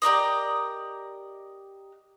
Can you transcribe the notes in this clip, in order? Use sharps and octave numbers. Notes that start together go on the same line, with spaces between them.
G4 A#4 D5 D#5